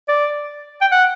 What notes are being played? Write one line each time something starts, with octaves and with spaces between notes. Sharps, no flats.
D5
G5
F#5